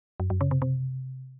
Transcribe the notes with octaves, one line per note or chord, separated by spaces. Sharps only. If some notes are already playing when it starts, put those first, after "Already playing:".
F#2
F#2
C#3
C3
C3